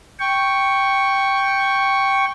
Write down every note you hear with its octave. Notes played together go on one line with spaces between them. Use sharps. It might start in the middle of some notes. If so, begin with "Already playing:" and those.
G5 C#6